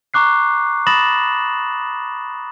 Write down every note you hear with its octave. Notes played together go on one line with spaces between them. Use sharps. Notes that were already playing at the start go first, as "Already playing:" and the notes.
A#5 C#6 D6 F#6 C7
B5 D#6 A6 A#6 E7 F#7